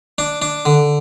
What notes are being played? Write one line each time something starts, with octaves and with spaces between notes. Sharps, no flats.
D4
D4
D3